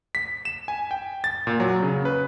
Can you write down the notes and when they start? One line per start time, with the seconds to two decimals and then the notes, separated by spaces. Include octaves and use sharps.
0.15 B6
0.45 E7
0.68 G#5
0.91 G5
1.24 A6
1.47 A#2
1.60 F#3
1.83 C#3
2.05 B4